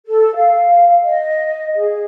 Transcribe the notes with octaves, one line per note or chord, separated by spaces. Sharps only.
A4
F5
D#5
G#4